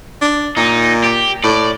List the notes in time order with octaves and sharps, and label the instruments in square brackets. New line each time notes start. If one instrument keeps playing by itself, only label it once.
[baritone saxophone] D4
[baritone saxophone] A#2 [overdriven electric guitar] D#4
[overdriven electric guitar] G4
[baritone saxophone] A2 [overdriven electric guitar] D5